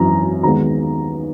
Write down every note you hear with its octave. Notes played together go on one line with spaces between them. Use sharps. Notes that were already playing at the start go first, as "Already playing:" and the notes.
Already playing: G#1 F#2 E3 A#5
D#2 D#3 G#3 B3 A#5